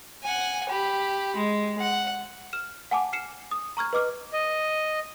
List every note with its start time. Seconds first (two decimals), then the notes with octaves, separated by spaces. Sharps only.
0.24 F#5 G#5
0.70 G4 B5
1.37 G#3
1.81 F#5
2.53 F6 E7
2.91 F#5 G#5 A5 D6
3.13 F6 C7 C#7 E7
3.51 D#6
3.77 A#5 C#6 F6 G#6
3.93 B4 D#5 D6 F6
4.33 D#5